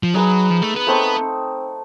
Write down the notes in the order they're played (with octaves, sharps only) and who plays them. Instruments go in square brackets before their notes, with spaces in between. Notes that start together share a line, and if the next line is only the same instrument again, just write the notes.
[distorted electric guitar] F3
[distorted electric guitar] F#3 [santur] D#4 G#4 B4
[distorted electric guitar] F3
A3
B3
[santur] A3 C4 D#4